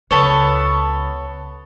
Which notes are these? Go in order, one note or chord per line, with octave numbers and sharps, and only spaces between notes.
C#2 B3 A4 C#5